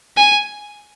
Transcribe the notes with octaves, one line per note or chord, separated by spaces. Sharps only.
G#5